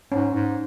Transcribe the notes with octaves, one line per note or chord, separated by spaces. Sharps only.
G#2 C#4
G#2